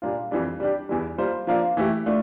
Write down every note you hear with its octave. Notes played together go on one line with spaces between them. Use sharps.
A#2 G3 A#3 D4 F4
F2 E3 G3 D4
G3 D4 G4
E2 E3 G3
G3 A#3 F4 C5
F3 A#3 D4 F4
E3 A3 E4 G4
A3 D4 F4